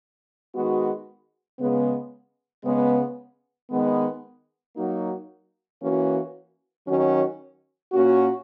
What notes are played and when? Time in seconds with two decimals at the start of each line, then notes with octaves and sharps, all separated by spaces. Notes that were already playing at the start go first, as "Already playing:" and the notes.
0.54 D#3 G#3 B3 F#4
1.60 C#3 G#3 B3
2.65 C#3 G#3 B3
3.71 D#3 G#3 B3
4.76 F#3 A#3 D#4 F#4
5.82 E3 A#3 C#4 F#4
6.87 D#3 F#3 C#4 F#4
7.93 A#2 A#3 C#4 F#4